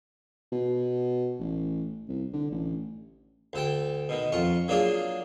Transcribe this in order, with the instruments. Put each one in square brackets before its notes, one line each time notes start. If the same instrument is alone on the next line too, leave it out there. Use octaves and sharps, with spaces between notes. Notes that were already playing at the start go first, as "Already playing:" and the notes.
[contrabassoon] B2
A1
C2
D3
A1
[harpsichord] D2 A4 G5
B2 D#3
F2 F4 C#6
F#3 A#3 D4 F4 G#4